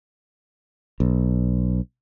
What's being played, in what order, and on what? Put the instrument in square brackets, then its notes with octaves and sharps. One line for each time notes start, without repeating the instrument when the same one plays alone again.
[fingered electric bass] B1